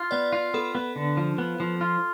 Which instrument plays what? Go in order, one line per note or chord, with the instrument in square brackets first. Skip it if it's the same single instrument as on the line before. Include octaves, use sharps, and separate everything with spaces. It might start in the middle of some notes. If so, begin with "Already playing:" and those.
Already playing: [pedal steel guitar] F4
[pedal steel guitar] B3 [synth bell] D5
[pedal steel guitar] F4
[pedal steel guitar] B3 [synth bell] A4
[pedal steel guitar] B3
D3
F3
B3
F3
F4